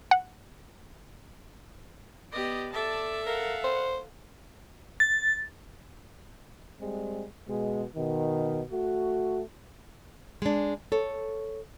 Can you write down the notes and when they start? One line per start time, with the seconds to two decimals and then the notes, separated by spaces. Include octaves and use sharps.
0.11 F#5
2.32 B3 G4 D5 D#5
2.73 A4 D5 E5 A5
3.26 A#4 F5 F#5
3.64 C5
5.00 A6
6.80 G3 G#3 C4
7.47 B2 G#3
7.95 B2 D#3
8.70 A3 F#4
10.42 G#3 D4
10.92 A4 C#5